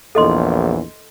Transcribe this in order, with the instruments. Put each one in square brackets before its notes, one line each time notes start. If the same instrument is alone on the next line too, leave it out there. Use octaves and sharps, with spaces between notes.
[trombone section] A#1 E2 [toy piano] A4 D#5 C6